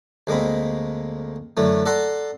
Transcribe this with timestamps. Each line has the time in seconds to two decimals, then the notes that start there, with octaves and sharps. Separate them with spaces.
0.27 D2 G#3 A#3 C4 B5
1.57 F#2 D3 E3 A3
1.86 A4 D5 F#5 A#5 C6